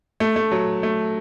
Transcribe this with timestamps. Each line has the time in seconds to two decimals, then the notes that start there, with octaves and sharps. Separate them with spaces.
0.20 A3
0.36 A3
0.52 F#3
0.83 A3